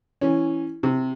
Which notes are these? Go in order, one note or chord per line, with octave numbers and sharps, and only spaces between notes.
E3 C#4
C3